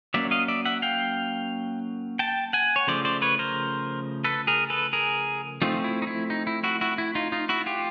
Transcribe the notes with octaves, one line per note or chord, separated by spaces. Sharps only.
F#3 A#3 C#4 D5 E5
D#5 F5
D5 E5
E5 F#5
F5 G5
G5 A5
F#5 G#5
C#5
C#3 F3 A3 C5 D5
C5 D5
B4 C#5
A#4 C5
A4 B4
G#4 A#4
A4 B4
G#4 A#4
F3 A3 C4 D#4 F4
E4
D#4
E4
D#4
E4
E4 F#4
E4 F#4
E4
D#4 F4
D#4 F4
E4 F#4
F4 G4